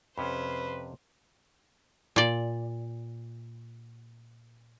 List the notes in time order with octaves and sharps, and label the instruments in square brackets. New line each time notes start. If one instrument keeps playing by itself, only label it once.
[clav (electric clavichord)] F2 C3 C#4 [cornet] B4 [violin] C5 [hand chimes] B5
[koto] A#2 D5